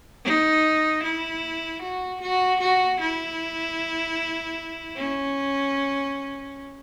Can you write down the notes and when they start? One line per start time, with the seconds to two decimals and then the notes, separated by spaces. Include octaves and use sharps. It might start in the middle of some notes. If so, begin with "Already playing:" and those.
0.24 D#4
1.03 E4
1.82 F#4
2.21 F#4
2.60 F#4
3.00 E4
4.96 C#4